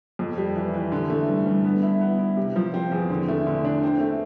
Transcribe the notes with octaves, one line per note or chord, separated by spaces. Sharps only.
F2
G3
E3
E3
D3
A3
G2
G2
B3
E4
B3
E4
C3
F3
C4
E2
D3
A3
D3
D4
C4
A3